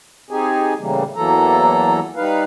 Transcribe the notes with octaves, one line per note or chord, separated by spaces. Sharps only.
C4 D#4 G4 G#4 G#5
A2 C#3 E3 G3 A#3
E2 E3 F#3 A#3 A4 A#5
G3 D#4 B4 F5